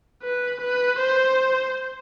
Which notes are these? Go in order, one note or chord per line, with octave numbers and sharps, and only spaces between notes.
B4
B4
C5